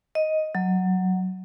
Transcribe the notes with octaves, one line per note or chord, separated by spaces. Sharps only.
D#5
F#3